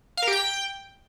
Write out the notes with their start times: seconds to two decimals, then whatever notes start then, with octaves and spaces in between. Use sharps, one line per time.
0.17 F5
0.22 A#4
0.27 G4
0.33 G5